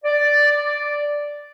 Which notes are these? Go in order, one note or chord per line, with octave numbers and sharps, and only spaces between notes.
D5